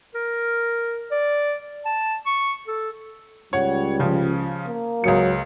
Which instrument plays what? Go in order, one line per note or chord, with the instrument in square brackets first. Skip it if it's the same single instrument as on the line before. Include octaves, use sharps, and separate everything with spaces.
[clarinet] A#4
D5
A5
C#6
A4
[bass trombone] C#2 [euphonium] G3 [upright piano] C#5 F#5
[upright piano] C#3 F3
[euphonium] A#3
[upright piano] C#2 G#4 C#7 [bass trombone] F#3